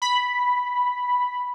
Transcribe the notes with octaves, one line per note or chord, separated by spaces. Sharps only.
B5